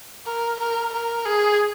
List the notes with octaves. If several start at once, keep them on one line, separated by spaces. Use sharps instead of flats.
A#4
A#4
A#4
G#4